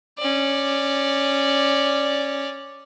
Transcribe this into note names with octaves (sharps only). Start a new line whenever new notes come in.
C#4 D5